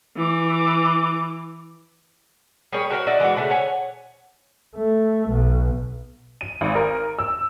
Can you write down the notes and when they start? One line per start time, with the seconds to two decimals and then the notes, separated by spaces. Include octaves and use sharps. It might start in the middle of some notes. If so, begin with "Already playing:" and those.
0.17 E3 D6
2.73 G3 G#4 A#4 C#5
2.90 F#4 A#4 C5 C#5
3.07 D#4 F#4 D5 E5
3.20 E3 G#3 D4 F#4
3.36 C#3 A3 D4
3.50 C#5 F#5 G#5
4.75 A3
5.29 B1
6.41 D#7
6.61 G#1
6.75 A#4
7.19 E6